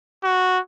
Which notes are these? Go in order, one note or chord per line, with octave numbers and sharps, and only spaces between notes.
F#4